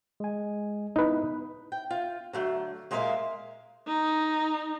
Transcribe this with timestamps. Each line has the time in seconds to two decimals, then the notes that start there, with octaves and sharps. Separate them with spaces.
0.20 G#3 G#5
0.96 B3 D#4 E4 B4
1.72 G5
1.90 F4
2.33 D3 F#3 A3
2.91 A#2 G#3 A#3 A#4 E5 F5
3.88 D#4